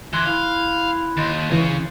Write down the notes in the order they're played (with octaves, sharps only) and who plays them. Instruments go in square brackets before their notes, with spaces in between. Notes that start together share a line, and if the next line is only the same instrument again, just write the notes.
[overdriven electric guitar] E3 [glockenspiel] C6 F#6 G7
[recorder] E4 [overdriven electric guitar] F5
[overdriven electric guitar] D#2 [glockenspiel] C6 G6 A6
[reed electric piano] C#2 E3 [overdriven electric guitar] C#3